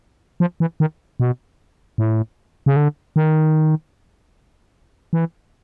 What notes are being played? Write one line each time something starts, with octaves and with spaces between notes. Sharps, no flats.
F3
E3
D#3
B2
A2
C#3
D3
D#3
E3